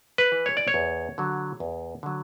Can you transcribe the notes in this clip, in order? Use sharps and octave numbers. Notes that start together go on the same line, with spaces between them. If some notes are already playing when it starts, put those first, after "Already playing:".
B4
E3
C#5
D5
C#5
E2
D3 F#3
E2
D3 F#3